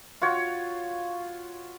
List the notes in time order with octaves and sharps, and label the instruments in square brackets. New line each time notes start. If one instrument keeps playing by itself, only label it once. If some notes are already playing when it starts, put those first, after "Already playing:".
[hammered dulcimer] F4 F#4 C#5